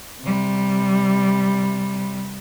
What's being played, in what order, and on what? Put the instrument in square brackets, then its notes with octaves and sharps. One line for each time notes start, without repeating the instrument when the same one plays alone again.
[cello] C3 G3